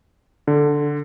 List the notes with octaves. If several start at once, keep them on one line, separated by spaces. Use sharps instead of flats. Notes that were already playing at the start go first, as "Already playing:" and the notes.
D3